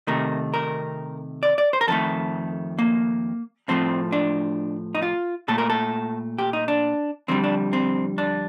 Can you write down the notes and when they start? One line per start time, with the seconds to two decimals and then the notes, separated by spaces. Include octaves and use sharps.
0.07 C3 D#3 A3 A#4
0.54 A#4
1.43 D5
1.58 D5
1.73 C5
1.81 A#4
1.88 F2 D#3 A3 A4
2.79 A#3
3.68 A2 F3 A3 C4
4.12 D4
4.95 D#4
5.02 F4
5.48 A#2 A3 A4
5.58 A#4
5.70 A4
6.38 G4
6.53 D#4
6.68 D4
7.28 F2 D3 G3 C4
7.44 D4
7.73 C4
8.18 D4